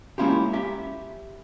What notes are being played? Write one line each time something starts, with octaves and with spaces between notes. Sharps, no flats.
G#3 A#3 C#4 E4 F4 G4
G4 E5